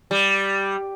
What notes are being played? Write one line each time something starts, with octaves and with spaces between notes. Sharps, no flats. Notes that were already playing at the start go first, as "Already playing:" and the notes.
G3